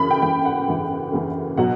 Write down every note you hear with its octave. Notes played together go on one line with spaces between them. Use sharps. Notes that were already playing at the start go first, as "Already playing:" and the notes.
Already playing: F#2 C#3 E3 B5
G5
F#2 C#3 E3 G5
F#5
F#2 C#3 E3
F#2 C#3 E3
B2 F#3 F#5